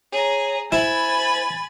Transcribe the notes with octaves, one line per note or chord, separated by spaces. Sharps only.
G#4 C#5 A#5
E4 C5 G#5 B5 A6